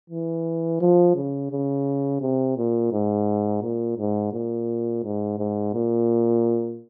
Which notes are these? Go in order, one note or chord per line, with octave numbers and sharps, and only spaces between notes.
E3
F3
C#3
C#3
C3
A#2
G#2
A#2
G#2
A#2
G#2
G#2
A#2